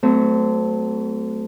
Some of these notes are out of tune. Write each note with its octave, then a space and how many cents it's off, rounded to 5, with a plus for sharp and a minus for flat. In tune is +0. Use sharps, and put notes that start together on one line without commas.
F#3 +25 A3 +0 C4 -30